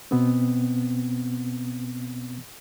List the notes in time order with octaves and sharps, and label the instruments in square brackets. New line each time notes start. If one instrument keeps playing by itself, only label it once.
[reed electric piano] B2 B3 C4